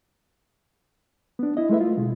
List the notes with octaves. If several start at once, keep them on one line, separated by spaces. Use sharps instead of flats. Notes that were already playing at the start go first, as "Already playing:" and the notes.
B3 D4
E4 D#5
G#3 A3 E4 B4 E5
F4
B2 G#3